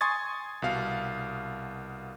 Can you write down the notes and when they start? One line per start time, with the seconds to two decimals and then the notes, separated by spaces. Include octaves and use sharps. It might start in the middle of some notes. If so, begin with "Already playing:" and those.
0.01 G#5 C6 C#6 D#6 G#6 A6
0.62 C2 B2 F5